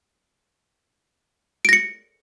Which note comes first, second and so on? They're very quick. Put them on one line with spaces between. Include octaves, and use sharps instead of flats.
D7 A#6 C#7